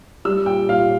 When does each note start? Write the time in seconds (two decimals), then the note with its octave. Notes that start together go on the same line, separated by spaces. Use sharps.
0.25 G3 E6
0.46 A#2 G5
0.69 A#2 F5